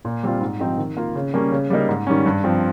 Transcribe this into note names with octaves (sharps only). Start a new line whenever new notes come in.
A#2
G3 C4 F4
G#2
F3 C4 D#4 G4
D#3
A#3 F4
C#3
G3 A#3 C#4
C#3
G3 A#3 D#4
G#2
D#3 G3 C#4
G2
F3 C4